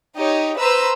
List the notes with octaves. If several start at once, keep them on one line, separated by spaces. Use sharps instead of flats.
D#4 G4 C#5 D#5
B4 C5 A#5 E6